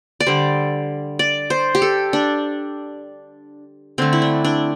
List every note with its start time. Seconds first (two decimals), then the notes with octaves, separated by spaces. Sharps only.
0.20 D5
0.26 D3 G3 C5
1.19 D5
1.50 C5
1.75 G4
1.82 A4
2.13 D4
3.98 D3 A3 C4
4.13 E4
4.22 D4
4.45 D4